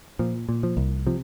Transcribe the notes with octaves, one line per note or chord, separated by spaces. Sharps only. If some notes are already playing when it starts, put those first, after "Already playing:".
A#2 F3
A#2
F3
C2
C3 F3